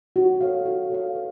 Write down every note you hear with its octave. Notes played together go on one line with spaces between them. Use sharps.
F#4
A4 C#5 F5
F#4
A4 C#5 F5
B4